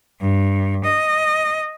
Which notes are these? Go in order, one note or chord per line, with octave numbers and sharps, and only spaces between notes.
G2
D#5